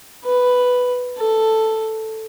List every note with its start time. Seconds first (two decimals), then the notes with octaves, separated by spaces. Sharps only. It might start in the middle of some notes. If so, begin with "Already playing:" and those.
0.24 B4
1.17 A4